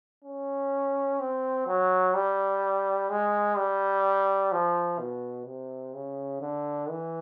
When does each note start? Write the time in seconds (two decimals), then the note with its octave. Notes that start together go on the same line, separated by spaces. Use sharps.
0.25 C#4
1.20 C4
1.67 F#3
2.15 G3
3.10 G#3
3.57 G3
4.52 F3
4.99 B2
5.46 C3
5.94 C#3
6.41 D3
6.90 E3